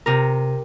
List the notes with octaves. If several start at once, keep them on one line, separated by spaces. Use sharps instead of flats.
C3 A#4